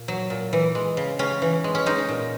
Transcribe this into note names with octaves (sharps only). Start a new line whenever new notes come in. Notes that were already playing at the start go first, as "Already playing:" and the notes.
Already playing: A#2
F#3
A#2
E3
G#3
C#3
C#3 C#4
E3
G#3
C#4
G#3 D#4
A#2